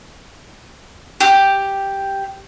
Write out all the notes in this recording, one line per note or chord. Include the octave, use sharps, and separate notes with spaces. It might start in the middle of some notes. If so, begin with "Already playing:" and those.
G4